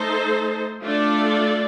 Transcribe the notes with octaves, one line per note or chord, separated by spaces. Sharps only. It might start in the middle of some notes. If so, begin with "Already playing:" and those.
Already playing: A3 D#4 A4 C5
A3 D4 F4 A4 D5